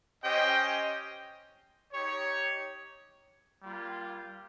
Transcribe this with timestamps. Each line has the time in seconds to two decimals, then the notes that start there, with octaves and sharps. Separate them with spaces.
0.23 C#4 G4 C5 D#5 G5
1.92 D#4 G4 C#5
3.61 G3 A#3 F4